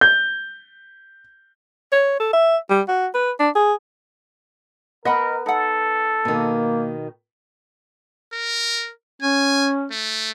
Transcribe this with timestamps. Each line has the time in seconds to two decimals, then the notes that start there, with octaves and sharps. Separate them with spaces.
0.01 G6
1.92 C#5
2.20 A4
2.33 E5
2.70 G3
2.88 F#4
3.14 B4
3.40 D4
3.55 G#4
5.05 B3 A#4 B4 D#5 F#5 B5
5.46 D#4 A4 F#5
6.25 B2 D#3 A#3
8.33 A#4
9.22 C#4 G#5
9.91 A3